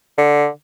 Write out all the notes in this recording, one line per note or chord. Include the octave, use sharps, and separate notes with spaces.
D3